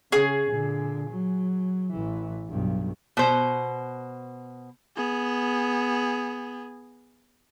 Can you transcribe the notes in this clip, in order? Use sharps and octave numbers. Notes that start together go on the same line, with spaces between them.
C#3 C#4 G#4
A#2 D3
F#3
A1 E3
B1 G2
B2 C5
B3 G#4